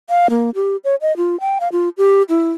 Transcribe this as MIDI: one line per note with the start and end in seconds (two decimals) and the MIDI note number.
0.10 0.27 77
0.30 0.50 58
0.55 0.77 67
0.84 0.95 73
1.01 1.15 75
1.17 1.39 65
1.40 1.58 79
1.60 1.68 77
1.72 1.89 65
1.97 2.22 67
2.29 2.52 64